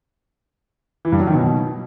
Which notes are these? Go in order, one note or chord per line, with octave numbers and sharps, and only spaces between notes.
E3
G2
F#3
D#3
B2